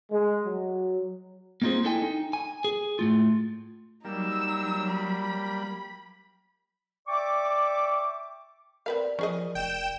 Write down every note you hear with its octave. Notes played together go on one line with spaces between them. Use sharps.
G#3
F#3
A#3 C4 D#4 F4 G#4 C5
D4 E4 A4 D#5 G5 G#5
D#4
G#5
G#4
A2 A3 F4
F#3 G3 A#3 D#4 E6
B5
D5 E5 G5 C#6 D6
C4 A#4 B4 D5 F5
F3 C#4 G#4 D#5
F1 G5 E7